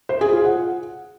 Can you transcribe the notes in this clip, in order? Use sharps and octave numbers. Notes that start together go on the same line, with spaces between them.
C5
G#4
F4
F#5